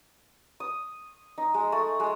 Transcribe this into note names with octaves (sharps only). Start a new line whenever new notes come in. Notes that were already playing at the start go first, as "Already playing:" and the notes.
D#6
D#4
G#3
A3
G#3